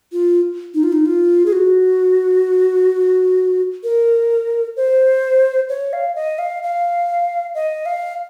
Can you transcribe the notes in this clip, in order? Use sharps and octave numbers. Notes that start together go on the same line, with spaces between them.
F4
D#4
F4
D#4
F4
G#4
F#4
A#4
C5
C#5
F5
D#5
F5
F5
D#5
F5